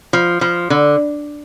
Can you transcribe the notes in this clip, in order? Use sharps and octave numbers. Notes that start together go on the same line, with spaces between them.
F3
F3
D3